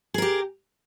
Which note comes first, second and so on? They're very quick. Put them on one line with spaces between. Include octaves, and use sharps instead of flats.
G#4 A#4 G4